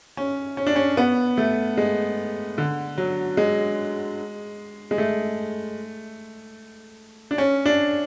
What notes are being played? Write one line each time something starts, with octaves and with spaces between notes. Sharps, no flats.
C#4
C#4
D4
C#4
B3
A3
G#3
D3
F#3
G#3
G#3
A3
D4
C#4
D4